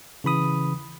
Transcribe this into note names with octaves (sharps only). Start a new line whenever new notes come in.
C#3 E3 B5 D#6